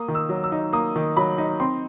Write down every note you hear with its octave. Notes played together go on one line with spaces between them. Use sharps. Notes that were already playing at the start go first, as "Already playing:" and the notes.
Already playing: A#3 D#6
D#3
E6
F#3
E6
D#4
A#3 D#6
D#3
F#3 B5
D#4
C4 C6